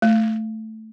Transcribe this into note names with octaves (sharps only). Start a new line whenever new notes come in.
A3